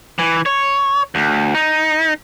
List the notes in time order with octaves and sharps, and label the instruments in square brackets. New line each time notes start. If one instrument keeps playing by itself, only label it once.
[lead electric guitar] E3
C#5
D2
D#4